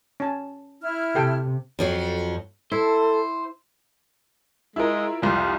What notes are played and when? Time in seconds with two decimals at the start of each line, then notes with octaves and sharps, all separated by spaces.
0.20 C#4 A5
0.81 E4 F6
1.15 C3 G4 A4 G5
1.79 F2 F3 F#3
2.72 E4 A4 C5
4.76 G#3 E4 F4 A#4
5.22 C2 F2 F4